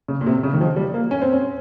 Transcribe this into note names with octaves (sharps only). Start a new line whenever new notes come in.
C#3
A#2
C3
C#3
D#3
F3
G3
A#3
C#4
C4
C#4